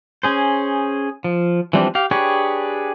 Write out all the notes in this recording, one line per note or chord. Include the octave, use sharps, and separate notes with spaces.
C#4 G#4 C5
F3
E3 F3 G3 C4 D4
G4 F5
D4 G4 G#4 B4 C#5